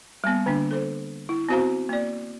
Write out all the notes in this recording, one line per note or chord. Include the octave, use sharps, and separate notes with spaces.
G3 A#3 B3
D3 A#3 D4
A4 C5
E4
B3 C4 F#4 C5 F5 A#5
A#3 D5